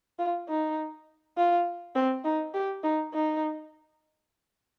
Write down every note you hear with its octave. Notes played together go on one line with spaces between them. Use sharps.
F4
D#4
F4
C4
D#4
G4
D#4
D#4